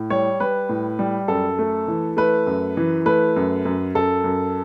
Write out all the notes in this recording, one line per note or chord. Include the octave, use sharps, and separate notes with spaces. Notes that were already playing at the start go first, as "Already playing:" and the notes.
Already playing: A2
G3 C#5
G3 B4
A2
G3
F#2 A4
A3
E3
A3 B4
F#2
E3
A3 B4
F#2
F#2
F#2 A4
F#2